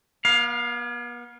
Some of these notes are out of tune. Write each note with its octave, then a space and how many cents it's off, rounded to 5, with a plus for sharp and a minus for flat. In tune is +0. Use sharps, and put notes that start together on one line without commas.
B3 -40 F5 +10